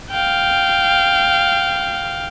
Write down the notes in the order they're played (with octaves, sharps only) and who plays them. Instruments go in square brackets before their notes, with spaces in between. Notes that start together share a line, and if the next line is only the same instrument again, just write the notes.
[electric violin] F5 G5